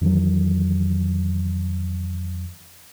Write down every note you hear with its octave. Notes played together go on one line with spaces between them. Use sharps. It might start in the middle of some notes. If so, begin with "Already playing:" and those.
F2 D#3 E3 F#3